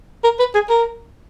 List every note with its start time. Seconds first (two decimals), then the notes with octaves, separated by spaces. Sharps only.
0.24 A#4
0.40 B4
0.54 G#4
0.69 A#4